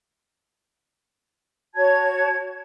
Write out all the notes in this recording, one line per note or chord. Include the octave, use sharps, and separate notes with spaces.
F#4 C#5 A5 G#6